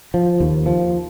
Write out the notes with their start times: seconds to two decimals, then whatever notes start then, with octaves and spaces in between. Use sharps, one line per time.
0.14 F3
0.40 D#2
0.66 F3